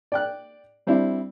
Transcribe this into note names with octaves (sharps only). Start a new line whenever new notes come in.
D5 G5 F#6
G3 C4 D4 E4